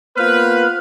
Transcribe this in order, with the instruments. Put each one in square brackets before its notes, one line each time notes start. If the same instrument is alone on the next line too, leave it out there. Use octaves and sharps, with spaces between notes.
[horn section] A#3 B3 B4 [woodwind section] F4 C5 F6